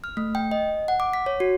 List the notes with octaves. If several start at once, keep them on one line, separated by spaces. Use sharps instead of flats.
F6
A3
G5
D#5
F#5
D6
B6
C#5
F#4